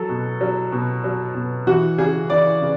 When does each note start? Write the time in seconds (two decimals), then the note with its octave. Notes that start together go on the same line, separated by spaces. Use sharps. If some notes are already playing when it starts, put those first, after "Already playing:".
Already playing: F#3 A4
0.09 B2
0.41 F#3
0.72 B2
1.04 F#3
1.35 B2
1.67 E3 F#4
1.98 C#3 G#4
2.30 E3 D5
2.61 C#3